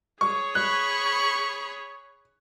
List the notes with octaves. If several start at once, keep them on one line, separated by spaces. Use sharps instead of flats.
G#4 C#5 C#6
B5 C#6 F#6